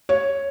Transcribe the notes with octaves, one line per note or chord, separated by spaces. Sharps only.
C#5